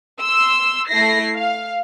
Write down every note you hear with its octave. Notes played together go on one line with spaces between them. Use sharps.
C6 E6
A3 E4 A#6 C7
F5